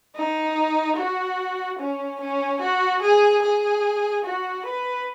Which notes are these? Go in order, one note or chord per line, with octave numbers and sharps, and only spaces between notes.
D#4
F#4
C#4
C#4
F#4
G#4
G#4
F#4
B4